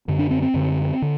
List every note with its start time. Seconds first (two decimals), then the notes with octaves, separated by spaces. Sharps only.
0.08 F#2 D3
0.19 D4
0.31 C4
0.42 C4
0.54 F#2 D3
1.02 D3